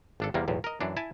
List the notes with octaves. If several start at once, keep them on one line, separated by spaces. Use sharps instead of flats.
G#1 D4 A4
E2 C3 G3 A#3
B1 E2 A2
A#4 D#5
F#2 E3 D4
E4 G#5 A5